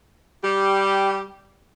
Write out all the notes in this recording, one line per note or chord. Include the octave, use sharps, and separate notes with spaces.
G3 G4